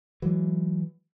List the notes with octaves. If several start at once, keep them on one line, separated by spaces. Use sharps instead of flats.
E3 F#3 G#3